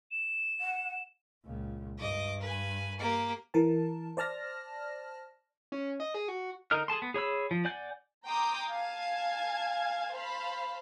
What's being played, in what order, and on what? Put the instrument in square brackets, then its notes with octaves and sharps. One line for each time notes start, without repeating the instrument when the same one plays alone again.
[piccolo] E7
[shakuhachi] F#5
[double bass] C#2 A#2
[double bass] G2 [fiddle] D#5 D6
[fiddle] B4 G#5
[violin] A#3 [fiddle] G4 D6
[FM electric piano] E3 A#4 A5
C5 D5 A5 F6 A#6
[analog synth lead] C#4
D#5
G#4
F#4
[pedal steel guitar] D3 D#4 A#4 D#5 F6
G#4 A4 A5 C6
B3
G#4 C#5 B5 E6
F3
D5 F#5 G#5 G6
[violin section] G5 A#5 C6 D6 D#6 G6
F5 G#5 A5 G#6
C5 F5 A5 B5